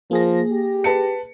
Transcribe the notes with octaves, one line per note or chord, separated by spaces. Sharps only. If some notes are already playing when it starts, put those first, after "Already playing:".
F3 A#3 G#4 A#6
G4
B4 A5 C#7